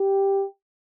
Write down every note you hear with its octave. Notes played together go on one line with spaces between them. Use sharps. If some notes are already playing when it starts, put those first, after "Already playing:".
Already playing: G4